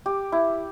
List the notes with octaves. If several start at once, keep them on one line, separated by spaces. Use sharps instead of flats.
G4
E4